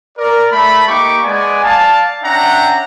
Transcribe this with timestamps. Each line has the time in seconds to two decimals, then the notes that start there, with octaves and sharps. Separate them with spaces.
0.17 A#4 D5
0.51 A3 B5
0.87 A#3 D#4 G4 C#6 D6
1.23 G#3 B3 D5 G#5
1.64 D5 F5 A5
2.22 C#4 D4 E5 F#5 G5 A#5